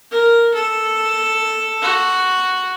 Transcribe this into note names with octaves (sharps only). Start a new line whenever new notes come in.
A#4
A4
F#4